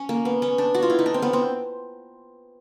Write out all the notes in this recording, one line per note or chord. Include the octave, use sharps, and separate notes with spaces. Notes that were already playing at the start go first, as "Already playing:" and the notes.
Already playing: C#4
A#3
B3
C#4
D4
F#4
F4
E4
D#4
D4
C4
B3
C4